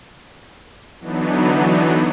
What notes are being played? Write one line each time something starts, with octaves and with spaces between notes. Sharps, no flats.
D3 E3 F#3 B3 D4 D#4